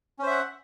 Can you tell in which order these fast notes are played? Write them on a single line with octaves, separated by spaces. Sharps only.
C#4 C5 E5 F#5